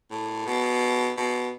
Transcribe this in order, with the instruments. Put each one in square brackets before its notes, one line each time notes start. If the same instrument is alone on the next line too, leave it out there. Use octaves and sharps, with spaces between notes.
[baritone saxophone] A2
B2
B2